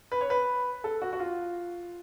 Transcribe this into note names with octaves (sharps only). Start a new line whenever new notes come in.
B4
C#5
B4
A4
F#4
F#4
F4